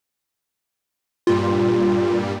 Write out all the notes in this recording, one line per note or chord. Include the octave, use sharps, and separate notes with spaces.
G2 A#2 G3 F4